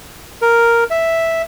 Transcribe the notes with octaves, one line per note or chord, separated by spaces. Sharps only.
A#4
E5